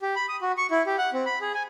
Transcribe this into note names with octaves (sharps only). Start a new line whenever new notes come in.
G4
B5
D#6
F#4
C#6
E4
G4
F#5
C4
B5
G#4
G#5